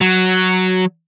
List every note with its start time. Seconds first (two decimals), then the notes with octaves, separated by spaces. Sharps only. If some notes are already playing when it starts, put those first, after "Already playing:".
0.01 F#3